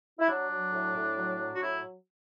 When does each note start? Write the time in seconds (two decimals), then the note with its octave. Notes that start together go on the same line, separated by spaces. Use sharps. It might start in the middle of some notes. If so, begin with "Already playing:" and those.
0.19 E4
0.28 F#3 D4
0.50 F#3
0.72 A2
0.95 A2
1.17 F#3
1.39 F#3
1.54 F#4
1.61 A2 E4